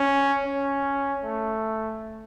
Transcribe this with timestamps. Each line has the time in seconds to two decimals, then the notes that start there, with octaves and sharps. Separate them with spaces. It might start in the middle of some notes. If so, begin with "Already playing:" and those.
Already playing: C#4
0.45 C#4
1.25 A3